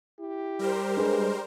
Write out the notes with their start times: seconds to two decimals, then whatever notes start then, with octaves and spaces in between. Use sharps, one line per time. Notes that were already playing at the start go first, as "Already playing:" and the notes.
0.20 E4 G4
0.59 G3 A#4 C5
0.97 G#3 D4 G#4 B4